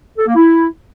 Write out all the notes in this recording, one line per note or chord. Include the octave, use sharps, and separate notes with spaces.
A4
A#3
E4